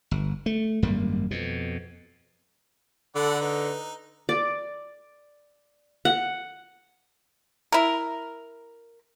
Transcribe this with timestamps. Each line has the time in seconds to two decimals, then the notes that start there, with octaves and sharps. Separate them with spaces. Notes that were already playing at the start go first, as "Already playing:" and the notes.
0.11 G1
0.46 A3
0.83 G#1 F#2 G3 A#3
1.31 F2 B2
3.15 D3 A4 D5 F#5 B5
3.41 D#4 B4
4.29 D5
6.05 F#5
7.72 E4 A#4